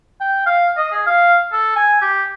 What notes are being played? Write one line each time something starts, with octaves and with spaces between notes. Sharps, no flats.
G5
F5
D#5
G#4
F5
A4
G#5
G4